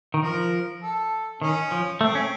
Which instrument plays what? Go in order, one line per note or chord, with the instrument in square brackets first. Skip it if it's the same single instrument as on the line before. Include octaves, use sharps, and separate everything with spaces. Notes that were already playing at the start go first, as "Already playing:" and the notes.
[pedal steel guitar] D#3
[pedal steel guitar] F3 [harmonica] A#4
[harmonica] A4
[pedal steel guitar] D#3 [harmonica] C#4
[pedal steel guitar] F3
[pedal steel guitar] A3 [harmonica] C4
[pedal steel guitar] C#4